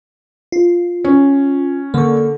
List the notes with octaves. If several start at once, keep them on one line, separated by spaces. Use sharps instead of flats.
F4
C#4
D3 A#3 C#6